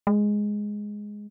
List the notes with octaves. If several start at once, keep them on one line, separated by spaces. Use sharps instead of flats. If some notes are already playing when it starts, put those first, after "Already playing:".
G#3